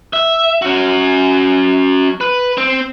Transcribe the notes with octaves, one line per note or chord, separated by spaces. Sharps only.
E5
C#4 F#4
B4
C4